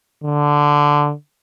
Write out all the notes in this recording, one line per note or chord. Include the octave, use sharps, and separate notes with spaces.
D3